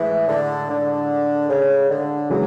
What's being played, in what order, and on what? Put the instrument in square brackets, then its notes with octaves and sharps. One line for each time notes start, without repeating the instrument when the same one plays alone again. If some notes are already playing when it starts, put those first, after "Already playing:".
Already playing: [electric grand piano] A2 G#3 [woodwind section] E3
[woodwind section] D3
D3
C#3
D3
[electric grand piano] C#3 E3 G#3 [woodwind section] F#3